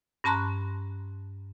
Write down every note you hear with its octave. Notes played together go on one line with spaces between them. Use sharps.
G2 C#4 A5 A#5 C6 F#6